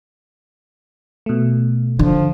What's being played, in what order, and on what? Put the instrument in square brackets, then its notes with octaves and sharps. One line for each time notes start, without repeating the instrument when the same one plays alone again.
[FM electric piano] B2 A3
[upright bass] D3 [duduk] F3